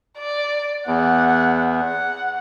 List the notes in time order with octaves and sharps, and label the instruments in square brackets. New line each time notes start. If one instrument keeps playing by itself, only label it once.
[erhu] D5
[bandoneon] E2 [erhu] F#5
[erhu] F#5